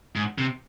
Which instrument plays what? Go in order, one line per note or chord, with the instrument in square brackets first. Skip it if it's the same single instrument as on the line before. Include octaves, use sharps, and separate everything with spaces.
[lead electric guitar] G#2
C3